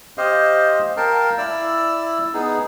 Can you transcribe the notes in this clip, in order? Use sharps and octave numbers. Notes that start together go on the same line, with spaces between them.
G4 C5 D#5 F5
A#4 F5 G5 A5
E4 D5 E6
B3 D#4 G#4